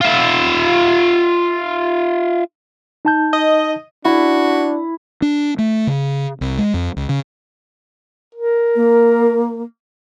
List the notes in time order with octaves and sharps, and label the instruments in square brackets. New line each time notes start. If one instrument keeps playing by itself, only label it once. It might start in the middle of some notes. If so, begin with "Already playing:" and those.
[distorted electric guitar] F4 E5
[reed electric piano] D#4 A5 G6
[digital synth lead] D#5
[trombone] D4 [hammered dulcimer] E4 [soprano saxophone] F#4
[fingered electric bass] D4
A3
C#3
C2
G#3
F2
C#2
C#3
[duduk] A#4
[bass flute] A#3